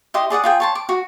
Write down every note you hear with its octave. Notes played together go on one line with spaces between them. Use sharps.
E4 G4 D#5 C6
G#4 D5 F#5 D#6
F4 G#4 G5
C#5 A5 C6
D6
F#4